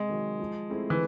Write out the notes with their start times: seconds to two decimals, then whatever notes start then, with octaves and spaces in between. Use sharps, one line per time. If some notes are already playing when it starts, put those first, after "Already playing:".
Already playing: C3 G#3
0.09 D#3 F#3
0.40 F3
0.70 A3 C4 E4 G#4
0.90 E3